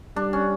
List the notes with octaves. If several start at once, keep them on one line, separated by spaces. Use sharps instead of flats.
G3 D4
C#4